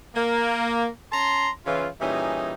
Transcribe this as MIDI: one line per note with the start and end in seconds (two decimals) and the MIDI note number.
0.15 0.88 58
1.12 1.49 61
1.12 1.49 81
1.12 1.49 82
1.12 1.49 84
1.66 1.88 49
1.66 1.88 52
1.66 1.88 65
2.01 2.53 46
2.01 2.53 52
2.01 2.53 55
2.01 2.53 61
2.01 2.53 63
2.01 2.53 68